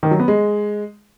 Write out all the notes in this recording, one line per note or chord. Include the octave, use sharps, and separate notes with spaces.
D#3
F#3
B3
G#3